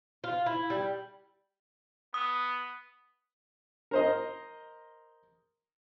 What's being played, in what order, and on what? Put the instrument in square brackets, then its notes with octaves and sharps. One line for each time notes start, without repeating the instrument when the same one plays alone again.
[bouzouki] F4
E4
G3
[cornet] B3 [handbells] D#6
[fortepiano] A#4 C5 D#5